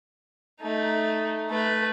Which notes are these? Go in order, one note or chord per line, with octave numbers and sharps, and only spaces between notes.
A3 D#4
A3 B4